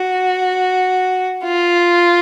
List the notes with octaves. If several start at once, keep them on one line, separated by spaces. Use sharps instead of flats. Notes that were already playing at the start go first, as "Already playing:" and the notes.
Already playing: F#4
F4